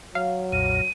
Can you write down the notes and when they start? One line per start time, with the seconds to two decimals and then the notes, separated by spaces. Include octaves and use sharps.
0.15 F#3 F5
0.52 B1 F2 A#2 D#7